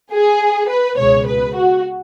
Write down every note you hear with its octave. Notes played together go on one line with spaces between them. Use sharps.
G#4
B4
C#2 B2 G#3 C#5
B4
F#4